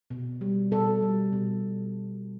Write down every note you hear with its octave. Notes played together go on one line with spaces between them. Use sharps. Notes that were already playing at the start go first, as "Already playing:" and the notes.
B2
G3
B2 A4
G3
B2